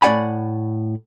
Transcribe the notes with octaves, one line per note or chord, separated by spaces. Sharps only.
A2 D#4 D5 F#5 G#5 B5